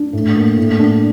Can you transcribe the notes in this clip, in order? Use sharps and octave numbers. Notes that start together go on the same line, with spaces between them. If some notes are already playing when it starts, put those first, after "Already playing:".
Already playing: D4
A2
A#3
A2
D4